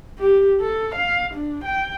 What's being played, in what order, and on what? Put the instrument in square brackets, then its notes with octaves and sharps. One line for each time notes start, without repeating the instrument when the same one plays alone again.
[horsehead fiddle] G4
A4
F5
D4
G5